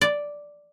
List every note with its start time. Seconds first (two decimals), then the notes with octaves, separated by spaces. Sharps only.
0.01 D5